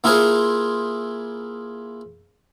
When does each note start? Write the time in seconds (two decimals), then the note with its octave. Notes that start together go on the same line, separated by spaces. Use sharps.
0.04 A#3 E4 F4 G#4 A#4 C5